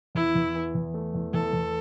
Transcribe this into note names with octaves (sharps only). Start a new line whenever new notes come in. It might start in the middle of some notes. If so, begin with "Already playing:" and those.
E2 E4
E2
E3
E2
A3
E2
E2 A4
E2